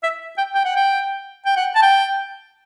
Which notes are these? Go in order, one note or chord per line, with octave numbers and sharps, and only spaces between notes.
E5
G5
G5
F#5
G5
G5
F#5
A5
G5